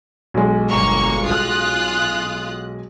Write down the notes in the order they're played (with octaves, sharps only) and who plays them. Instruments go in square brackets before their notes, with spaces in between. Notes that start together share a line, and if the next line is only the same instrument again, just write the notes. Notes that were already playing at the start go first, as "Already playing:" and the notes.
[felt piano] B1 G#3
[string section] G1 A#3 C#6
F4 D#6 F#6